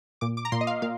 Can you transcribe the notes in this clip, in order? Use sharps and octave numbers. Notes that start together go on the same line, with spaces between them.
A#2 D6
D6
A#5
A#2 C6
D#5
F5
A#2 F5